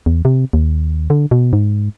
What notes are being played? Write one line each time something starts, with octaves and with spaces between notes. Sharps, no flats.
E2
C3
D#2
D3
B2
G#2